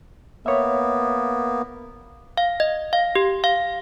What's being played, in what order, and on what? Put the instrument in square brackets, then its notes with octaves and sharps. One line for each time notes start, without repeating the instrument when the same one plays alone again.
[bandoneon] A#3 B3 [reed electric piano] C#5 E5
[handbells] F5
D#5
F5
G4
F5